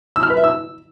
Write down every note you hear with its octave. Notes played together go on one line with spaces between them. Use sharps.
E6
F6
B4
E5
E6